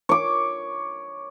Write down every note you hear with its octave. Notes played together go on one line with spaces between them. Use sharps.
C#5 D6